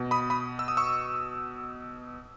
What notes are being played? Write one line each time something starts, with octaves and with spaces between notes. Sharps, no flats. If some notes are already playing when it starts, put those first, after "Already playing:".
Already playing: B2
B5 D#6
B5 D#6
E6
D#6
C#6 E6